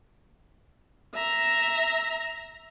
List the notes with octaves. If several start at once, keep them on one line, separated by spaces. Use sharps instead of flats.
E5 A#5